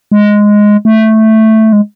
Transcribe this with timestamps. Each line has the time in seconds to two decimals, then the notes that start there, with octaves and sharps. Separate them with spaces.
0.12 G#3
0.85 A3
1.73 G#3